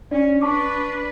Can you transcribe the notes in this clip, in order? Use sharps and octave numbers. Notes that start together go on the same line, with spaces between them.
C#4 D4 D5
D4 B4 A5 C#6 D6